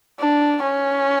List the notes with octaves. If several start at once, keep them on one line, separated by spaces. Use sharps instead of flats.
D4
C#4